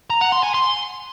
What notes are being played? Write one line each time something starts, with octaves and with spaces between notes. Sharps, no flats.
A#5
F#5
C6
G#5
C6